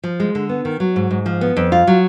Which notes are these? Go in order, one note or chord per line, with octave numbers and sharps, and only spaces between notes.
F3
G#3
D3
B3
D#3
F#3
G#2
G#2
F3
B3
F2
F4
F#3